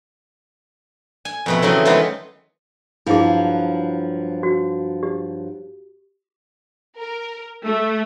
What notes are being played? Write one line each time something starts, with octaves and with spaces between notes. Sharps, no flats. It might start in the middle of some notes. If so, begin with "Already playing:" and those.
G#5
F2 B2 A3
C#3 E3 F#3 C4
D#3 E3 F#3 G#3 B3 F4
G2 F3 F#3 E4 G#4
F#4
G4
A#4
A3